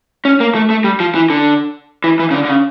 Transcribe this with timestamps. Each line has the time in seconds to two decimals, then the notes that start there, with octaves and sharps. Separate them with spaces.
0.25 C#4
0.40 A#3
0.55 A3
0.70 A3
0.84 G3
1.00 F3
1.15 E3
1.30 D3
2.04 E3
2.19 E3
2.31 C#3
2.34 D3
2.45 D3
2.49 C#3